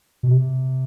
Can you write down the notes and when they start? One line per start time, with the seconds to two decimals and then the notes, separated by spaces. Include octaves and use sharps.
0.23 B2
0.31 C3